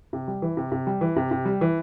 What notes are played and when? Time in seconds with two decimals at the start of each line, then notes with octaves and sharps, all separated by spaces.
0.13 C3
0.28 G3
0.42 E3
0.57 C3
0.72 C3
0.87 G3
1.01 E3
1.16 C3
1.31 C3
1.45 G3
1.61 E3